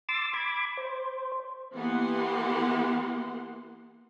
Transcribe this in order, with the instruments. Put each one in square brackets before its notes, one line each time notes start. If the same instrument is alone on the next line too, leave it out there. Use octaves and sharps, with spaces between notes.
[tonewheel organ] C6 D6 E6 A6
B5 D6 G#6
C5
[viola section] E3 A#3 B3 G4 F#5 C6